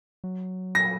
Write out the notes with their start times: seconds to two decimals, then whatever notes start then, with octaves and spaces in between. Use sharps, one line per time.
0.24 F#3
0.75 A#6